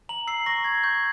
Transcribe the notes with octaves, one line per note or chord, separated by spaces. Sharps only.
A#5 F#7
E6 C7
C#6 A#6
C#6 G#6
C#6 G6